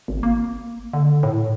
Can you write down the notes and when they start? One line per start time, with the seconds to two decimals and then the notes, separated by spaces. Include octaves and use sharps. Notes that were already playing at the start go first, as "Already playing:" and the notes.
0.08 G#1
0.23 A#3
0.93 D3
1.23 A2